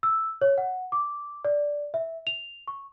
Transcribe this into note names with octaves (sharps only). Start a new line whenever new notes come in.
E6
C#5
F#5
D6
D5
E5
F7
C#6